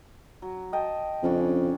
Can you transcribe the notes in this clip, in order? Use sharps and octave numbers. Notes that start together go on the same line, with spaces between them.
F#3
D#5 G5 A5
F2 C#3 C#4 D4